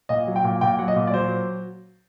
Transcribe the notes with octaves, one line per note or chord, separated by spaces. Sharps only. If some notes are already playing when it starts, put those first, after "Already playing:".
A#2 D#5
F#3
G5
A#2
A#2 G5
F#3 F#5
D#5
A#2
D5
F#3 C5